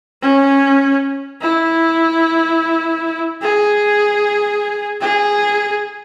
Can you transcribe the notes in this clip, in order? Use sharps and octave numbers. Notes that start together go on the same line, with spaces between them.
C#4
E4
G#4
G#4